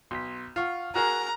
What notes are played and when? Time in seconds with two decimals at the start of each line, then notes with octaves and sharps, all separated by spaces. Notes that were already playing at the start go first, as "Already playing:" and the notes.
0.11 B1 C6 B6
0.56 F4 F#5 C#6 F6
0.95 F#4 G#4 A#4 A#5 F6 F#6